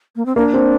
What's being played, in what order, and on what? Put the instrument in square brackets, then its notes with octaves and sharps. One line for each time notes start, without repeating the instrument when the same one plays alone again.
[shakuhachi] A#3
C4
[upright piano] A#3 [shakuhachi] D4
[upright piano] C4